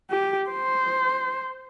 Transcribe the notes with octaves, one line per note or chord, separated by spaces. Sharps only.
G4
C5